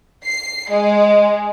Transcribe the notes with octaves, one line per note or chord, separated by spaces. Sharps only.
C7
G#3